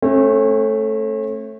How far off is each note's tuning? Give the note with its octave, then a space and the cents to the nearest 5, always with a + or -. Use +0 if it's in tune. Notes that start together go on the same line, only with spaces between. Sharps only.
A3 +0 C#4 -40